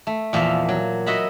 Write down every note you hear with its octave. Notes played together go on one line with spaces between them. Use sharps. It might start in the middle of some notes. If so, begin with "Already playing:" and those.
A3
E2 A#2 F3 E5 F5
F#3
F#4 D#5 E5 F#5 B5